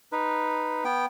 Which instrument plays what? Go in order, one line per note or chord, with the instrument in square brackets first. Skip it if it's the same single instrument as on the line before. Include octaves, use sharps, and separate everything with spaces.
[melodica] D#4 B4
B3 G5